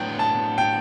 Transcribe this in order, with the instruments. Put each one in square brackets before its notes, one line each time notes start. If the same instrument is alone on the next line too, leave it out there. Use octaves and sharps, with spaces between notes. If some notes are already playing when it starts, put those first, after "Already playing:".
Already playing: [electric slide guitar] A2 F#3 B3 D4 [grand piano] G5
[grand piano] A5
G5